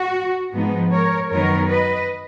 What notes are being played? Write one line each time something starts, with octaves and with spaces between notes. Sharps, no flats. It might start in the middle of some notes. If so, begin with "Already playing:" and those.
Already playing: F#4
G#2 F3 G#3 B3 D#4
A#4 C#5
F#2 D#3 F#3 B3 D#4 A#4 C#5
B4 D#5